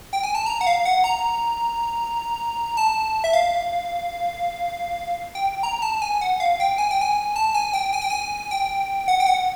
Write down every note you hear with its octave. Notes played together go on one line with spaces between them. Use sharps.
G5
G#5
A5
A#5
F#5
F5
F#5
A#5
A5
E5
F5
G5
A#5
A5
G#5
F#5
F5
G5
G#5
G5
G#5
A5
G#5
G5
G#5
G5
G#5
G5
F#5
G5
F#5